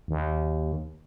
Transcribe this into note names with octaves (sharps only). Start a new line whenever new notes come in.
D#2